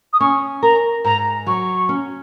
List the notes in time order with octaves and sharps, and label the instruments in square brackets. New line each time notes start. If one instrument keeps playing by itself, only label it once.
[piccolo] D#6
[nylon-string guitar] C#4 [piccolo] C#6
[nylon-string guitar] A#4 [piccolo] A#5
[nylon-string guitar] G#2 [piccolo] A#5
[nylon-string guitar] F#3 [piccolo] C#6
[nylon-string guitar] C#4